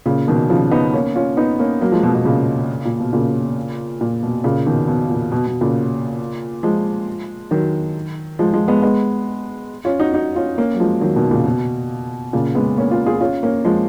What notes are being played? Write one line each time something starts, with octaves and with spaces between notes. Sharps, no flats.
A#2 C#3
B2 D#3
C#3 F3
B3 D#4
A#3 C#4
C#4 F4
B3 D#4
A#3 C#4
F#3 A#3
F3 G#3
B2
B2
A#2 C#3
A#2
B2
A#2 C#3
A#2
B2
A#2 C#3
B2 D#3
B2
A#2
B2
B2
A#2 C#3
F3 G#3
D#3 F#3
F3 G#3
F3 G#3
G#3 B3
G#3 B3
C#4 F4
D#4 F#4
D#4 F#4
C#4 F4
A#3 C#4
F#3
F3 G#3
D#3 F#3
B2 D#3
A#2 C#3
B2
A#2 C#3
G#3 B3
A#3 C#4
C#4 F4
F4 G#4
C#4 F4
A#3 C#4
F3 G#3